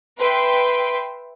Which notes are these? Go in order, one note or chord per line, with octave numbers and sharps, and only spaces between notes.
B4 E5 G5 C6